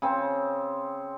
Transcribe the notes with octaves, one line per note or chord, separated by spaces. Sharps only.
C#3 C4